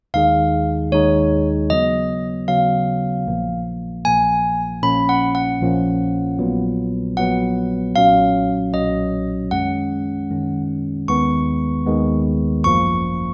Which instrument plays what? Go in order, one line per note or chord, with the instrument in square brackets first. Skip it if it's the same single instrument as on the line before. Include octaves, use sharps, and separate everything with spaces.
[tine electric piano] D#2 D#3 G#3 D#4 G#4 [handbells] F5
[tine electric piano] D#2 D#3 G#3 D#4 G#4 [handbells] C#5
[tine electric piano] C#3 F#3 B3 [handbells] D#5
[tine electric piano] C#3 F#3 B3 [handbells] F5
[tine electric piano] A#1 A#2 F3 A#3
[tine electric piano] A#1 A#2 F3 A#3 [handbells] G#5
[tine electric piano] A#1 A#2 F3 A#3 C#4 [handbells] B5
[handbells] F#5
F#5
[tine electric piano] A#1 A#2 F3 A#3 C#4
A#1 A#2 F#3 B3
[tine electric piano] A#1 A#2 F#3 B3 [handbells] F#5
[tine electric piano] B1 A#2 F#3 C#4 [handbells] F5
[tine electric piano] B1 A#2 F#3 C#4 [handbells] D#5
[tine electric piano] F#2 D#3 G#3 C#4 [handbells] F#5
[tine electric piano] F#2 D#3 G#3 C#4
[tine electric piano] D#2 D#3 G#3 B3 [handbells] C#6
[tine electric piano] D#2 D#3 G#3 B3
[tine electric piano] G#1 F#2 F3 A#3 [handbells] C#6